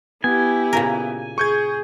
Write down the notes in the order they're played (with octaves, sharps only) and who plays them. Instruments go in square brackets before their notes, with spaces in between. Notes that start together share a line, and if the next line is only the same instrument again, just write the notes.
[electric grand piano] B3 [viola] E4 G4 [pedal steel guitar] G#5
[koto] A#2 C#3 A#4
[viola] G#4 [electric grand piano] C#6 G6 G#6